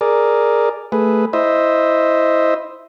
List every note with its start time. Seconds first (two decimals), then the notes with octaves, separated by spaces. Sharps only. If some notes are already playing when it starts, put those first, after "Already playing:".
0.01 G#4 A#4 D5
0.92 A3 G#4 B4
1.33 E4 C5 D#5 E5